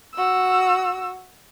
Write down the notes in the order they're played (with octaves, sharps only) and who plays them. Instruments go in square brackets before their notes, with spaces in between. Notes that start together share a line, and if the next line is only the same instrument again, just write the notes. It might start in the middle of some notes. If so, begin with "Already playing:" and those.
[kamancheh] F#4 E6